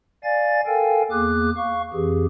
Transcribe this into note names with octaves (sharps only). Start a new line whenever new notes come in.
D5 F5 G#5 A6
A4 A#4 F5 G5 G#5
E2 A#3 G#4 D6 F#6
F5 C#6
F2 E3 G4 G#4